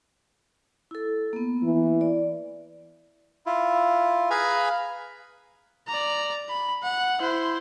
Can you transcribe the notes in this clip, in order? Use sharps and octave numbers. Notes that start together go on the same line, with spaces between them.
E4 A4
A#3 B3
E3
D5
E4 F4
G#4 B4 F5 G#5 A#5 B5
D5 A#5
B5
F#5
E4 C5